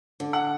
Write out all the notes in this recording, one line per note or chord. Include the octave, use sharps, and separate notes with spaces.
D3
F#5